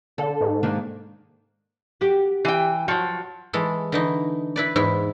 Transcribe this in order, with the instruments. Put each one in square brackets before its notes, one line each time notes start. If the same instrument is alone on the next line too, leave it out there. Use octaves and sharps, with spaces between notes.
[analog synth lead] D3 [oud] A4
[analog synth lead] G#2
[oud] D#3 A#3 D4
F#4 G4
[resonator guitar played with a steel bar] E3 G5
[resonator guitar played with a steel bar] F3 F#3 [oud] F#4
[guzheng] E3 G#3 A4
D3 E3 D#4
E4 B4 D5
E2 G#2 E4